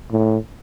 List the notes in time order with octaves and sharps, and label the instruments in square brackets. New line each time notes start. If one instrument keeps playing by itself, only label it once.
[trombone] A2